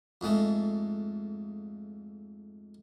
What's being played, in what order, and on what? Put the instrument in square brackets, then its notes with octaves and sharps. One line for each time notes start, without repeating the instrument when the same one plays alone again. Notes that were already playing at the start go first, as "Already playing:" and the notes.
[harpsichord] F2 G#2 G#3 A3